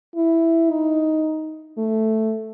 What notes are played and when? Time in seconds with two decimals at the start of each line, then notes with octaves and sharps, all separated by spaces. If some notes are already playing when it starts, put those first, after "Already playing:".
0.16 E4
0.70 D#4
1.78 A3